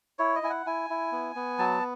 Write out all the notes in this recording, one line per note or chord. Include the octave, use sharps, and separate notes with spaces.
E4 C#5
D#5
E4 G#5
F#5
E4 G#5
E4
B3
B3
F#3 A5